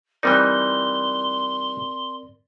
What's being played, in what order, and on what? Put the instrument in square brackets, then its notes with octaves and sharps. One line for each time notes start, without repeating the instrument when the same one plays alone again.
[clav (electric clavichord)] E3 G3 D#4 [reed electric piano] C4 A#4 D5 [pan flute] C6